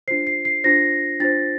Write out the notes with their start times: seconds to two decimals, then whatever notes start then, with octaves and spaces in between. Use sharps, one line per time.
0.08 D4 F4 C5 C7
0.27 C7
0.45 C7
0.64 D4 F4 C5 A#6
1.20 D4 F4 C5 A6